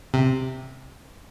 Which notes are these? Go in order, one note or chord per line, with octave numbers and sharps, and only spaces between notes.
C3